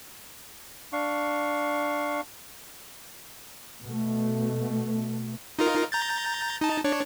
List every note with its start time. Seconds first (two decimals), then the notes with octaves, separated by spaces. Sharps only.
0.93 D4 F5 C#6
3.84 B2 A3
5.59 D#4 F4 A#4
5.92 A#5 G6 A6
6.61 D#4 A5
6.84 D4 C#5